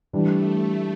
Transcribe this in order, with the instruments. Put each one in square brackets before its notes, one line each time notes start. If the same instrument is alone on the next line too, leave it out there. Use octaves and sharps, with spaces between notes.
[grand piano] E3 G3 D4 [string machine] A3